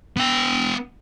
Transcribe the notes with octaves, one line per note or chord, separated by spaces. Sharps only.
B3 G5